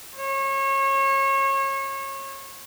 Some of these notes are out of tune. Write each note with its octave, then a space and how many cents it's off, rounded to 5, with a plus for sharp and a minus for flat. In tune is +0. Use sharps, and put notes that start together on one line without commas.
C#5 -30